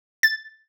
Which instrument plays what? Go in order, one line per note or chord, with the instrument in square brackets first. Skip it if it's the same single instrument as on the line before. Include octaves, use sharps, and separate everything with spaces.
[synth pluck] A6